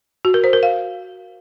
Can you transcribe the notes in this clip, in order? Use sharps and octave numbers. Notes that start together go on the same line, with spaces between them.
F#4
A#4
C5
A#4
F5